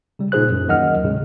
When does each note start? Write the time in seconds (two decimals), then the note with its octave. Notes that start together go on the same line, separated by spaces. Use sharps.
0.19 C#3 G3
0.32 A#2 D#4 G#4 C5 F#6
0.49 F#2
0.68 D#2 D#3 F#3 D#5 F#5 F6
1.03 A2 C#3 G#3